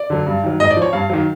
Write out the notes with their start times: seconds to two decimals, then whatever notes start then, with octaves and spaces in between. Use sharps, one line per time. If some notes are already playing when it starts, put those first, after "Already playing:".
Already playing: D5
0.10 D3 F#3
0.27 G2
0.43 D#3 F#3
0.60 G#2 D#5
0.71 D5
0.77 F3
0.82 C#5
0.93 G2 F5
1.10 D#3 F#3